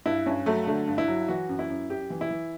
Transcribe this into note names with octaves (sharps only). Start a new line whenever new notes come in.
G2 E4
G2 C#4
F#3 A3
D3 A3
G2
E4
F#3
E3 F#4
F#2
E4
F#2
F#2 G4
E3
E4
E3